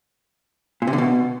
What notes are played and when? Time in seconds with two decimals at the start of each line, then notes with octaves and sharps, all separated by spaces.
0.82 A#2
0.87 C3
0.93 D3
0.98 B2